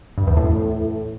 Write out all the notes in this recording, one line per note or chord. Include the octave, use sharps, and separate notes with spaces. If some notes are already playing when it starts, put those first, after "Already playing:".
G2
E2
A2